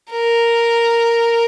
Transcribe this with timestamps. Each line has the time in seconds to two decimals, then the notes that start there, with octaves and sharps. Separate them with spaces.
0.11 A#4